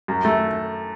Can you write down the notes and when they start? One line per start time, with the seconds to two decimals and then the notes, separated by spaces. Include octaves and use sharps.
0.08 F#2
0.25 A3